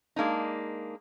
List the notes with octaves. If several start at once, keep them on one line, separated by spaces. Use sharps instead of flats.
G#3 A#3 D4 D#4